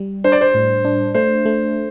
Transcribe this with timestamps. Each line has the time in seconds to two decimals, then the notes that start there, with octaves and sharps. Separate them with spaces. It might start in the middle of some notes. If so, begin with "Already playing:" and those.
Already playing: G3
0.24 D4 C5
0.32 D5
0.41 C5
0.54 A2
0.85 D4
1.14 A3 C5
1.46 A3